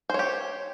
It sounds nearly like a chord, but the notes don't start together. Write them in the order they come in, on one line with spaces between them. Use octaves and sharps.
C5 C#5 G4